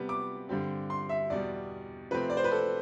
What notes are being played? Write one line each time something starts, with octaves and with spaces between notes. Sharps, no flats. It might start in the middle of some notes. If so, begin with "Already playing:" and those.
Already playing: C3 G3 B3
D6
G2 D3 G3 C4
C6
E5
E2 B2 G3 D5
C3 F3 A3 C4 B4
D5
C5
B4
A4